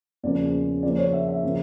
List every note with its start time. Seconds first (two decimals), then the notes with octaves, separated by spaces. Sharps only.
0.23 E2 C#3 F3 A#3 C#4 D5
0.83 C#3 F3 A#3 C#4 D5
0.98 C#5
1.13 E5
1.28 E5
1.43 C#3 F3 A#3